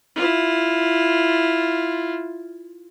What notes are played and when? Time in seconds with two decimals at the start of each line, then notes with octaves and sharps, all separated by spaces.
0.16 E4 F4